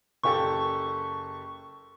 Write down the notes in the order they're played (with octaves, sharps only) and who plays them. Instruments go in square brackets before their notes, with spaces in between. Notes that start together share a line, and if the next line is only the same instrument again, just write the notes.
[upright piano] F#1 G4 A4 [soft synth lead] C#6